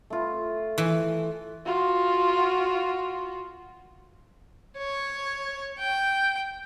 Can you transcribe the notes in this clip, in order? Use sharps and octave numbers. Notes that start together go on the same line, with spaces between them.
A3 F4
E3
F4 F#4
C#5
G5